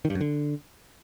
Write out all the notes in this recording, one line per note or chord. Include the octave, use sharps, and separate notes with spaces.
D#3
G2
F#2
D3